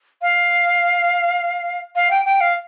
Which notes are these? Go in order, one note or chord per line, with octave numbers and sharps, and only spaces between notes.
F5
F5
G5
G5
F5